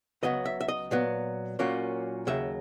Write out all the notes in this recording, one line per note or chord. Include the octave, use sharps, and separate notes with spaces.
C#2 C#3 F#3 B3 D#5
E5
E5
D#5
A#2 F#3 B3
A#2 F#3 A#3 C#4
D#2 C#3 F#3 E5